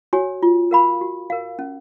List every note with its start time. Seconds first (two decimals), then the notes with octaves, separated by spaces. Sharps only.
0.13 F#4 C#5 G#5
0.43 F4
0.71 A#4 F5 B5
1.01 F#4
1.30 A#4 F5
1.59 C#4